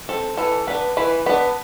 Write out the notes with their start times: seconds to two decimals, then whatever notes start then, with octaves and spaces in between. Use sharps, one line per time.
0.09 C4 A4
0.37 E3 A4
0.67 B3 D4 B4
0.97 E3 B4
1.26 B3 D4 B4